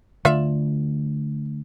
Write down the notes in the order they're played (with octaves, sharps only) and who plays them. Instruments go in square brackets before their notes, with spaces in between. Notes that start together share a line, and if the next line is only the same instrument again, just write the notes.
[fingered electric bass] D3 A3 [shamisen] F4 D5 E5